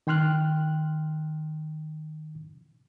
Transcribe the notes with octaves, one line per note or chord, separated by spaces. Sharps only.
D#3 G5 C6 F6 F#6